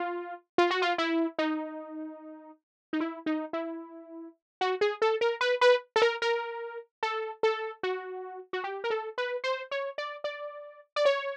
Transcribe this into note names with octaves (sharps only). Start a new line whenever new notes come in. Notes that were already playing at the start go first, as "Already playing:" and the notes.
Already playing: F4
F4
F#4
F4
E4
D#4
D#4
E4
D#4
E4
F#4
G#4
A4
A#4
B4
B4
A4
A#4
A#4
A4
A4
F#4
F#4
G4
A#4
A4
B4
C5
C#5
D5
D5
D5
C#5